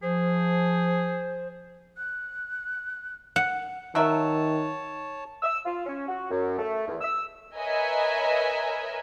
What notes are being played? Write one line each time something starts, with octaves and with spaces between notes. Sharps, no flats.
F3 G#4 C5
F#6
F#5
D#3 F#3 A#4 C#5 E5 A5
E6
F4
C#4
F#4
F#2
A3
E2
E6
A#4 B4 C#5 D#5 E5 G#5